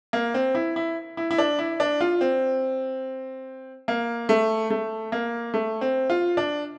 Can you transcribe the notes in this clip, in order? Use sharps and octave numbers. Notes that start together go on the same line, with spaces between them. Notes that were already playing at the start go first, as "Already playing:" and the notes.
A#3
C4
E4
E4
E4
E4
D4
E4
D4
F4
C4
A#3
A3
A3
A#3
A3
C4
F4
D4